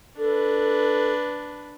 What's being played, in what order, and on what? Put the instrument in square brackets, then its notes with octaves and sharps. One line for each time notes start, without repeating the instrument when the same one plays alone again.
[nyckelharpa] D4 B4 [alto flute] A4